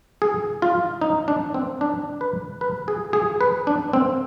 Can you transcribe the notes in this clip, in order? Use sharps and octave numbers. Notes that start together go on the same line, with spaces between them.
G#4
F4
D#4
D4
C4
D4
B4
B4
G#4
G#4
B4
D4
C4